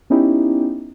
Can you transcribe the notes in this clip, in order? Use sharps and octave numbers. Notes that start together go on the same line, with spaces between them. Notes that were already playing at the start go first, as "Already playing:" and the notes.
B3 C#4 D#4 E4 G4